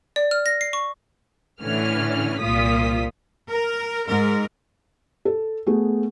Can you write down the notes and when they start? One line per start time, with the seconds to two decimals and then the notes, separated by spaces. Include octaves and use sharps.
0.16 D5
0.31 F6
0.46 A#6
0.61 C7
0.73 C#6
1.61 A2 D3 E3 C#4 F6
2.41 C2 A#2 F4 D#6 B6
3.48 A#4
4.06 G#2 A#4
5.25 A4
5.67 A3 B3 G#4